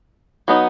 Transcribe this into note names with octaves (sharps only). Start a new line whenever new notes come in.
F#3 B3 D#4